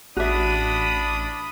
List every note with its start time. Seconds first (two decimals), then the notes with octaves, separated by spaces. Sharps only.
0.17 A1 D4 F#4 E5 B5 D#6